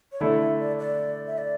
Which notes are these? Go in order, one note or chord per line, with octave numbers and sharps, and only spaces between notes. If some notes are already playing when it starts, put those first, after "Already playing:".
C#5
D3 A3 E4 A4 D5
E5
D5
D5
E5
D5